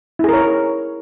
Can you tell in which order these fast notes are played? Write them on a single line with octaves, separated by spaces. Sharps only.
E4 G#4 A#4 C#5